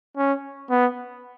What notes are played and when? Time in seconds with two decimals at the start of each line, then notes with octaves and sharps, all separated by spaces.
0.17 C#4
0.70 B3